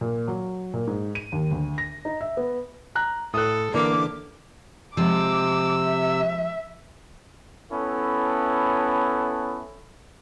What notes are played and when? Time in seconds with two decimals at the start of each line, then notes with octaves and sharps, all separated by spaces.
0.01 A#2
0.28 F#3
0.74 A#2
0.87 G#2
1.15 D#7
1.32 D#2
1.51 D2
1.78 A#6
2.05 D#4
2.21 E5
2.37 B3
2.95 A#5 F#6
3.34 A2 A4 D#6 F#6
3.74 D3 E3 A#3 D4 D6
4.97 C3 F3 G#3 D6 E6
5.84 E5
7.72 B3 C#4 E4 A4